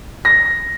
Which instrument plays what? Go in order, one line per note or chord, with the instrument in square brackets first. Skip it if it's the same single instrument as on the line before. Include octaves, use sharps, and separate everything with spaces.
[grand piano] A#6